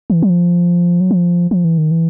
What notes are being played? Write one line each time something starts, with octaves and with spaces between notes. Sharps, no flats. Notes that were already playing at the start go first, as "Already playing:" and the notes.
E3
F#3
F3
F#3
F3
F3
E3
D#3
E3